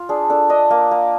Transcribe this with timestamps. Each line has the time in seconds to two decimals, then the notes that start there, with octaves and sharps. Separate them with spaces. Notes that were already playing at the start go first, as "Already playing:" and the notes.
Already playing: F4
0.09 D4 G#4
0.30 D4 A4
0.50 D4 D#5
0.70 A#3
0.91 A#3